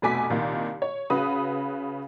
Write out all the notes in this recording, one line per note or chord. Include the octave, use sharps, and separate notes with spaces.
F1 B2 A3 G#5 D6 B6
C2 A#2 D#3
C#5
C#3 F#4 B4 D#6